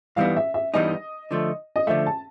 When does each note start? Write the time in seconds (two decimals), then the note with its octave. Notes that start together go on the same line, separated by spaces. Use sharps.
0.16 G2 E3 G3 B3 D#4 F5
0.37 E5
0.54 E5
0.74 G2 E3 G3 B3 D#4 D#5
1.31 D3 F3 A3
1.76 D#5
1.87 D3 F3 A3 E5
2.07 A5